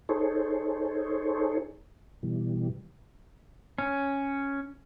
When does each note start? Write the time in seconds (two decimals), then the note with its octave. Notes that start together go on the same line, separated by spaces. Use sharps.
0.09 D#4 G#4 A4 C5 C#5
2.23 B2 E3 G3
3.78 C#4